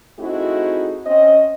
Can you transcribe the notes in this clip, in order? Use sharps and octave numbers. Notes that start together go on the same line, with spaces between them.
A3 C4 D#4 E4 F#4 G#4
C4 C#4 C5 D#5